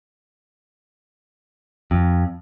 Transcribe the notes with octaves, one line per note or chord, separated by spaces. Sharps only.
F2